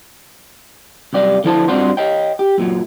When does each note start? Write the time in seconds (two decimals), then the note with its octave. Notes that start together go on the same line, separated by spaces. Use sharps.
1.13 C2 F#2 G4 D5 F5
1.44 D3 F3 E4 C5 A5
1.68 G2 C4 D4 F4 F#4 C5
1.97 C#5 D#5 G5
2.39 G4
2.58 F#2 A#2 F#3